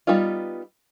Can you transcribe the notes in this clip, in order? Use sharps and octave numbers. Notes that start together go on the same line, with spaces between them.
G3 B3 D#4 F4